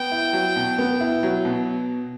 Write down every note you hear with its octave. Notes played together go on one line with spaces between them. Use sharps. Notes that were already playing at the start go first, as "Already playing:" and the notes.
Already playing: B3 G5
E4
F#3
B2
B3
E4
F#3
B2